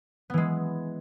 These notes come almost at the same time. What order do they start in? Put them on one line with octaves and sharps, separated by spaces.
B3 E3 G#3